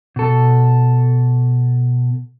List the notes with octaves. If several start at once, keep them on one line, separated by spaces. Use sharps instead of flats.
B2 A4